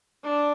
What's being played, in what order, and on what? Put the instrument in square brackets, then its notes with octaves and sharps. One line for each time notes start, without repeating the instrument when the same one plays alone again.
[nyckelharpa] D4